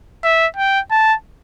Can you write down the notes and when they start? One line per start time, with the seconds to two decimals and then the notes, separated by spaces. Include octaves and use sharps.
0.24 E5
0.57 G5
0.91 A5